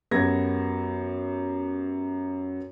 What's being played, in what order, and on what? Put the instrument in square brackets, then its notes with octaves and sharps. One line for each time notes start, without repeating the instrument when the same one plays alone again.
[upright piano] F#2 B3 G4 G#6 A#6